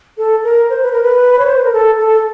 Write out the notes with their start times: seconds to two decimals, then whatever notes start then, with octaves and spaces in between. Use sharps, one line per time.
0.18 A4
0.44 A#4
0.70 C5
0.82 B4
0.92 A#4
1.03 B4
1.39 C#5
1.46 C5
1.56 B4
1.64 A#4
1.73 A4
1.99 A4